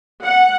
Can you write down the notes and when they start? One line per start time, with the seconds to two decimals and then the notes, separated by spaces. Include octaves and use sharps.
0.24 F#5